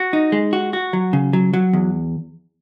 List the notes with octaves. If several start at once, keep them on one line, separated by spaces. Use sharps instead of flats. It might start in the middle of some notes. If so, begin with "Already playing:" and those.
Already playing: F#4
D#4
G#3
F#4
F#4
F#3
C#3
F#3
F#3
E2